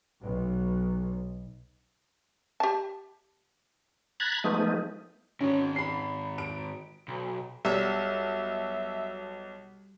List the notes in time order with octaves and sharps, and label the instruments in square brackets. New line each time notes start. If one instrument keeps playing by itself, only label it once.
[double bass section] B1
[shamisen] G4 A5
[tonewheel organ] A#5 B5 F#6 G#6 A6
F3 G#3 A3 B3 D#4
[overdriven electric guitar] G#2 D#3 [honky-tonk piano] C#4
[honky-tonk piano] B5 C7
D7
[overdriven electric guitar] B1
[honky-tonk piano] B1 [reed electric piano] G3 [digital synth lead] E5